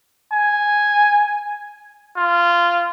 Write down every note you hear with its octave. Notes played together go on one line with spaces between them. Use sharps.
G#5
F4